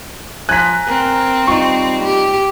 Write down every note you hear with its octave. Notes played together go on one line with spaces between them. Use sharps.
F3 G#5 A#5 F#6 B6
C4 A#4
G3 D#4 F4 C#6
G4